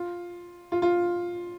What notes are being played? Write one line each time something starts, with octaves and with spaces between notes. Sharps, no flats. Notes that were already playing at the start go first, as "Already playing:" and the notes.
Already playing: F4
F4
F4